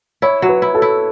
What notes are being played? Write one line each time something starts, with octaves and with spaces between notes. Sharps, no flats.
E4 C#5
F#3
B4
E4
A4
E4